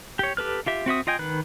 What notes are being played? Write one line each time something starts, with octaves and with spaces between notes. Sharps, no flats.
G4 C#5
G4 A4 B4 F6
F4 G4 E5
C4 F#4 E5 D#6
F4 D#5 G5 G#5
D#3 B4 F#6